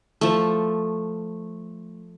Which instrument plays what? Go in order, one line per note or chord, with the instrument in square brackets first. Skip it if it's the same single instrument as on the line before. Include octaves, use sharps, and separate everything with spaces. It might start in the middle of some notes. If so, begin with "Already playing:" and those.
[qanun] F3 A3